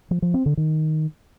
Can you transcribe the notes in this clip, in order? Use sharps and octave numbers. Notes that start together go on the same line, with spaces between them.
F3
F3
C4
D3
D#3